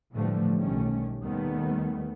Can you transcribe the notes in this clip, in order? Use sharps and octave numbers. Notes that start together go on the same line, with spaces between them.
A2 D3 E3 F3 G3 A3
B1 D#3 G3 A3 C#4
D#2 D#3 G3 A3 B3